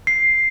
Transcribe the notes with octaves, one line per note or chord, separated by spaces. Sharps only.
C7